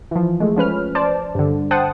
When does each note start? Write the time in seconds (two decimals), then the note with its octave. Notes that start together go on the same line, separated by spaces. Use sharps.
0.11 E3 F3
0.40 G#3 A3
0.56 F3 C#4 B4 F6
0.95 C5 D5 A5
1.35 G2 D3
1.71 C5 F#5 G5 A5 D#6